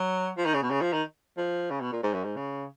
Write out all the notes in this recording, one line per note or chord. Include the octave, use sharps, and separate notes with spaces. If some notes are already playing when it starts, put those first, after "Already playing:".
Already playing: F#3
F3
D#3
C#3
B2
C#3
F3
D#3
F3
C#3
B2
A#2
G#2
F#2
G#2
C#3